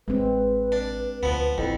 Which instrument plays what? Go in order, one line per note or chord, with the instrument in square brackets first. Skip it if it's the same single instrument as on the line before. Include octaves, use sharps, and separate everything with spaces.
[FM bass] A1 [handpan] G#3 C4 [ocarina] B4
[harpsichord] D4
[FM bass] D2 [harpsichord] F3 B3
[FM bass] A1 [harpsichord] F2 [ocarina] E4